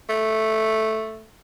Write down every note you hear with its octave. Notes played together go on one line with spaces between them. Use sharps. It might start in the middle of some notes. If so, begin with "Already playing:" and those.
A3